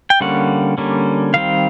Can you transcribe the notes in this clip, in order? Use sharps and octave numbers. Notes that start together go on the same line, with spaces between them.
G5
D3 G3 A#3 C#4 F#5
D3 G3 A#3 C#4
D#3 G3 C4 F5